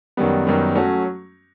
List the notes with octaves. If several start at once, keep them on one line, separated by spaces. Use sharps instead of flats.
F#2 D#3 G3 B3
F#2 D#3 G3 B3
F#3 A3 C#4 F#4